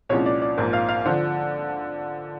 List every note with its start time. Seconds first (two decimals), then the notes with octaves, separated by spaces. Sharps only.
0.09 C2 A#2 F3 G#3 C#4 C#5
0.26 D5
0.42 D5
0.57 A#1 G#2 F3 A#3
0.73 F5
0.89 F5
1.05 D3 F3 C5